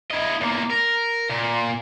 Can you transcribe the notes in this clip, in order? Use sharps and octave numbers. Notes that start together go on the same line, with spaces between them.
E4 D#5
E2 A#3
A#4
A#2